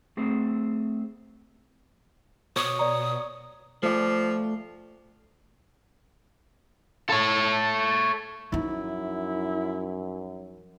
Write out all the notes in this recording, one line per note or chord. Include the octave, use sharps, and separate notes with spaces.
A3 C4 G#4 C5
B2 C#5 D#6
D5 A#5
F3 A3 D5
A4 C#5
F#2 F3 D#4 E4